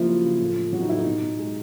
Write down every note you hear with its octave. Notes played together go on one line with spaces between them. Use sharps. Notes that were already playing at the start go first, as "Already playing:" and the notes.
Already playing: C#3 F3 A#3 E4 F4
F#3
C#3
A2
A3
E3 F#3 F#4
D#4
A2 E4
D#4
B2
B2
G#3